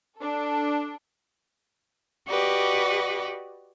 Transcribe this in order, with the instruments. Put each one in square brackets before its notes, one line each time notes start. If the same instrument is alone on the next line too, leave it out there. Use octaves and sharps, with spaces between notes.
[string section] D4 A4
[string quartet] F#4 G4 B4 D5 D#5